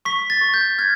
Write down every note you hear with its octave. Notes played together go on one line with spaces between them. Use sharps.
C#6 B6
A6
C#6
G6
F6 G#6